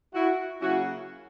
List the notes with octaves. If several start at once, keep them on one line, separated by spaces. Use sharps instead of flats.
E4 F#4
C#3 F#3 A#3 C#4 E4 F#4